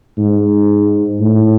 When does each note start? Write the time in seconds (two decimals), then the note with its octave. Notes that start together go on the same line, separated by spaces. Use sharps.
0.18 G#2
1.20 A2